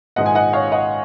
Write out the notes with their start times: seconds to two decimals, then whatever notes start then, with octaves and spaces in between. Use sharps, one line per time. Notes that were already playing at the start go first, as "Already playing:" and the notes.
0.16 A#1 G#2 D#3 G#3 D#5 F#5
0.26 G#5
0.35 D#5 F#5
0.53 C#5 F5
0.72 D#5 F#5